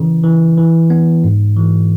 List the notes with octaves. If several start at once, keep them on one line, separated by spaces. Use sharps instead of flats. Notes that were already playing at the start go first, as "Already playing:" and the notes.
Already playing: C#3 E3
E3
E3
B3
G#2
E3